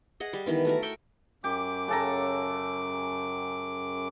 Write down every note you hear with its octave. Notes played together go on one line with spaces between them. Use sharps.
G#4 D#5 F#5
G3
D#3 E3 B3
A3 F#4 A#4
F#4 E5 G5 C#6
F#2 G4 D6
C#3 A4 A#5